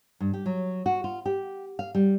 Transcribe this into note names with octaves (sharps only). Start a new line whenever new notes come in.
G2
G4
F#3
F#4
F4
G4
F5
G3